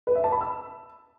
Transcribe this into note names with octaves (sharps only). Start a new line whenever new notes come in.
B4
E5
A5
B5
E6